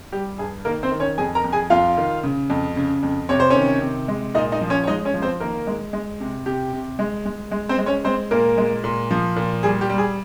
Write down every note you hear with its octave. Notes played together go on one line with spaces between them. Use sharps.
G3 G4
G2 G#4
D#3 A#3 A#4
C4 C5
D#3
C#4 C#5
F2 G#4 G#5
A#4 A#5
F2
G#4 G#5
F2 F4 F5
D#3
C#3
F2
C#3
F2
C3 C#5
C5
C#4 C#5
D#3
C3
G#3
A#2 D#4 D#5
D#4 D#5
F3
C#4 C#5
C#5
G#3 D#4 D#5
C#4 C#5
F3
C4 C5
D#3 A#3 A#4
G#3
G#3
C3
C3 G4
C3
G#3
G#3
G#3
C4 C5
G#3
C#4 C#5
G#3 C4 C5
A#2 A#3 A#4
G#3
A#2
F3
A#2
G3 G#4
G4
G3
G#4